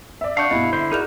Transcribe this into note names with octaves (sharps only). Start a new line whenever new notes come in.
D5 E5
D4 F5 F#5 A5 C#6 G6
G2 B2 E4 D#5
D3 C5 E5
D#4 F#4 G#4 A#4 D5 F6 G6 F7